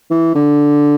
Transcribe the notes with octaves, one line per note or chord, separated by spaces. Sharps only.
E3
D3